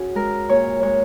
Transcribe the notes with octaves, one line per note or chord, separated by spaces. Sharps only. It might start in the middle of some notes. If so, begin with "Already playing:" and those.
Already playing: C#4 F#4 G#4
G#3 A#4
A#2 C#5
G#3 C#5